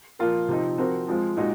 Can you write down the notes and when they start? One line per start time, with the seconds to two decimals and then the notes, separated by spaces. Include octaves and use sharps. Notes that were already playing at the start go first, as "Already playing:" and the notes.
0.19 A#2 F3 A#3 F4 A#4
0.48 C3 F3 C4 D#4
0.77 F3 C4 F#4 A#4
1.07 F3 G#3 C4 F4
1.37 A#2 G#3 D#4 F#4